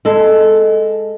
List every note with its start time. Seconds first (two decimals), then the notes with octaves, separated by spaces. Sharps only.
0.05 G#3 A4